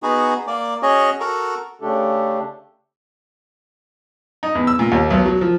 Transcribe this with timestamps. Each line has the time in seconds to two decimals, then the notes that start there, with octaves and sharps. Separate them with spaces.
0.03 B3 D#4 F#4 G#4
0.47 A#3 D5
0.83 C#4 F#4 G#4 C#5 D#5
1.20 F#4 A4 A#4
1.81 C#3 A3 D4 G4 A4
4.43 D#4
4.55 E2
4.67 E6
4.79 A#2
4.92 D#2
5.10 B1
5.26 F#3
5.41 F3